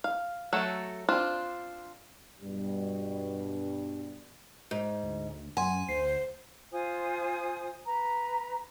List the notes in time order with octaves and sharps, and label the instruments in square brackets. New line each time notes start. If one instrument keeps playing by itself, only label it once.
[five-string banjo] F5
F#3 A3 F#4 A4
C4 D4 F4
[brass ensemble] G2 B2 G3
[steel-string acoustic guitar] G#2
[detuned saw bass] D2
[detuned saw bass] F#2 [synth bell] F#5 C6 [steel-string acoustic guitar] G#5
[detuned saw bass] D2 [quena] C5 [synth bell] C7
[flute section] F4 C5 G#5 D#6
B4 A#5